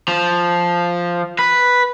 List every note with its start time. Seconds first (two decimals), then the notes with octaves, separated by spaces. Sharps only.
0.08 F3
1.39 B4